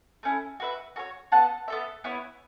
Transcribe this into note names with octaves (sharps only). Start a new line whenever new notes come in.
A3 C#4 E4
F#4 B4 E5
F#4 A4 C#5
B3 A4 F#5 A5
B3 A4 E5
B3 E4 C#5